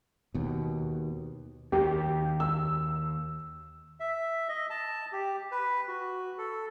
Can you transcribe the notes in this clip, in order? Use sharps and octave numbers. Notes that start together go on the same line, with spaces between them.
D#2 B2
D#2 D#3 G4
E6
E5
D#5
A5
G4
B4
F#4
A4